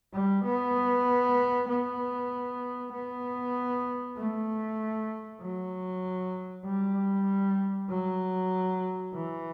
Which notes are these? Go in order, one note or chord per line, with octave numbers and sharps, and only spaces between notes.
G3
B3
B3
B3
A3
F#3
G3
F#3
E3